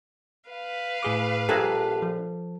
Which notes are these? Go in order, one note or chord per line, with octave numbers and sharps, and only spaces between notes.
B4 F5
A2 G#4 D6
A#1 G4 A4 G#5 A#5 F#6
F3